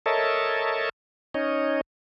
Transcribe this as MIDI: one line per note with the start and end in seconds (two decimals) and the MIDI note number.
0.06 0.89 69
0.06 0.89 70
0.06 0.89 73
0.06 0.89 75
0.06 0.89 76
0.06 0.89 81
1.34 1.81 61
1.34 1.81 63
1.34 1.81 73
1.34 1.81 75